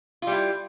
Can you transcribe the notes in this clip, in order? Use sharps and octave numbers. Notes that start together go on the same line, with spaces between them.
G3 E4 F4